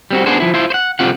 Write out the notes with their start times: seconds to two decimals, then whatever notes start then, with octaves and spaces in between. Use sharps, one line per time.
0.11 G3 C4 F#4
0.26 B3 D4 F#4 G#4 C5
0.40 F3 E4
0.54 E4 F4 C5
0.70 C5 F#5
0.99 C2 D#3 G3 C4 F4 F#5